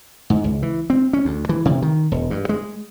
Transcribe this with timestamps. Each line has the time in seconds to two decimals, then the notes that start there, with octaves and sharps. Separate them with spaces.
0.30 G#2
0.44 C#2
0.63 E3
0.90 C4
1.13 C#4
1.25 D2
1.49 E3
1.65 C3
1.82 D#3
2.12 E1
2.30 G2
2.49 G#3